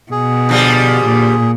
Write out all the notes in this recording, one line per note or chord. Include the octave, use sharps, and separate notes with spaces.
B2 G#4
D3 F3 G3
A#2